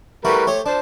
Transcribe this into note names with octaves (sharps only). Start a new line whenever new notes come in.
G3 A3 E4 F#4 A#4 B4
A3 G4 C5 C#5
D4 C5 A5